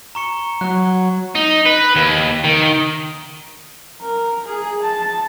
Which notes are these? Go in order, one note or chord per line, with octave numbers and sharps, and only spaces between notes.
A#5 C#6 C#7
F#3 C#6 F#6
D#4
B4
D#2
D#3
A#4
G#4
A5